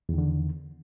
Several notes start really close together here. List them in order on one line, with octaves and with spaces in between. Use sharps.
E2 D#3 D3